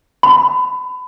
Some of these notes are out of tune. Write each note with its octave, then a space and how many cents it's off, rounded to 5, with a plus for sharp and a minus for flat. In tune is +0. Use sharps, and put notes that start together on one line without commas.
B5 +30